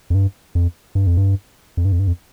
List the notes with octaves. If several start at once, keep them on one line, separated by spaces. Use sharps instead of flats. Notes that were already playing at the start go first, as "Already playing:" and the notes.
F2
G2
F2
G2
F2
G2
F2
G2
F2
G2
F2